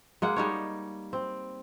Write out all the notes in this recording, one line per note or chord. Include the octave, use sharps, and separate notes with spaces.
G#3 A#3 F#5
G3 D#4 C#5
C4